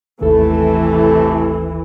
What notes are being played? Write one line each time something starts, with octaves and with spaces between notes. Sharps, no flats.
G#1 D#2 C3 E3 A3 A4